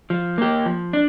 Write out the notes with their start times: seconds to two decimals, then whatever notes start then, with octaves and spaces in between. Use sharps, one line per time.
0.10 F3
0.38 A#3 G4
0.66 F3
0.93 D4